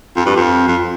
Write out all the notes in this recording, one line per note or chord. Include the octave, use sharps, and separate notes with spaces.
F2
G2
F2
F2